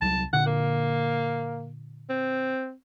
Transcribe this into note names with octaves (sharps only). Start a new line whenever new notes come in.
C2 F#3 A5
A#2 D3 F#5
A#3
C4